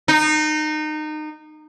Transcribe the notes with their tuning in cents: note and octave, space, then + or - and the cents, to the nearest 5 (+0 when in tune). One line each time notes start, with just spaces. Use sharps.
D#4 -25